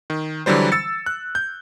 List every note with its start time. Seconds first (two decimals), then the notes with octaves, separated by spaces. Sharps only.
0.10 D#3
0.46 D3 E3 F#3 G3 C5
0.72 E6 A6 C#7
1.06 F#6
1.35 G6